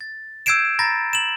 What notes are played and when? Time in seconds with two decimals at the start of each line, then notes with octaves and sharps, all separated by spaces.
0.01 A6
0.46 E6 G6 G#6 C7 D7 E7
0.79 A#5 B5 A6 A#6
1.13 E7 F#7